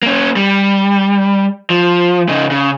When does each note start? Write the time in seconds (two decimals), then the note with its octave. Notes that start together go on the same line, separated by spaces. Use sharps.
0.03 A#3 C#4
0.36 G3
1.70 F3
2.29 C#3 D#4
2.51 C#3